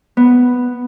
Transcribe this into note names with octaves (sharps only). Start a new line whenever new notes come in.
B3